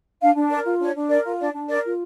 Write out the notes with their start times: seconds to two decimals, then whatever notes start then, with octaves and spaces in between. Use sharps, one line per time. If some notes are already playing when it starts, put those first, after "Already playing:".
0.21 D4 F5
0.35 D4
0.50 A#4 D5
0.65 F4
0.80 D4 C#5
0.95 D4
1.10 A#4 D5
1.24 F4
1.40 D4 D5
1.54 D4
1.69 A#4 D5
1.85 F4